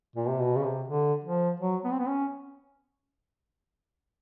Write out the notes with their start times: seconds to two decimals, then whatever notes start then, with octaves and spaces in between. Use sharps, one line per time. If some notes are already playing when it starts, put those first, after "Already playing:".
0.16 A#2
0.28 C3
0.40 B2
0.57 C#3
0.64 C3
0.88 D3
1.24 F3
1.60 F#3
1.84 B3
1.92 C4
1.99 B3
2.08 C#4